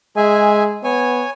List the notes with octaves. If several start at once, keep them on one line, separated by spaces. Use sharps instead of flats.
G#3 G#4 E5 G#5
B3 C#5 G#5